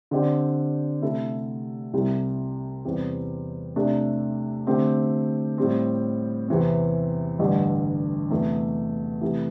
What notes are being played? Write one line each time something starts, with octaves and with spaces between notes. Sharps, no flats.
D3 C4 G4 D5
C3 A3 E4 A4
C2 C3 G3 E4
E2 C3 G3 C4
C3 A3 D4
D3 A3 C4 G4
A2 G3 C4
E2 C3 E3 C4
A1 G2 D3 G3
E2 C3 A3
C3 E3 A3 E4 G4